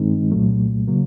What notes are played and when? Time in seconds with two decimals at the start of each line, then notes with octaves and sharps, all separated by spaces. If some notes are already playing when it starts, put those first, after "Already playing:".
Already playing: G2 D#3 G#3 C4 D#4
0.31 C2 A#2 F#3 A3
0.88 C#3 F#3 A#3